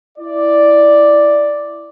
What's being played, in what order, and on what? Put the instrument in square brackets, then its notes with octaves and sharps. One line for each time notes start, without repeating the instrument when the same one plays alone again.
[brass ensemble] E4 D5